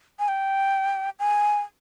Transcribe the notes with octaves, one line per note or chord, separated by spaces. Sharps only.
G#5
G5
G#5